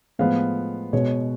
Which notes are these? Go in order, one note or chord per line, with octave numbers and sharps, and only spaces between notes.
A2 F3 G#3 B3 F5
B2 G#3 B3 C#5